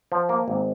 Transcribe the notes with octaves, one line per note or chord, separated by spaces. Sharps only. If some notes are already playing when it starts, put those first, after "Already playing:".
F3
A#3
G#1